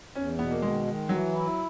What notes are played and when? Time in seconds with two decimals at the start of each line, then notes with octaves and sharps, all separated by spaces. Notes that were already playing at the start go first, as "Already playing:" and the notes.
0.15 E2 C#4
0.38 B2 B3
0.51 A#3
0.62 D#3 G#3
0.86 D#3
1.09 E3 F#3
1.33 E4